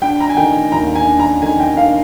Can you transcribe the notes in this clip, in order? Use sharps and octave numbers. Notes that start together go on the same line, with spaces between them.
D4 G5
A#5
G#5
D#3 G5
D#2 A#5
G#5
D4
A#5
D#3 G#5
G5
D4 F5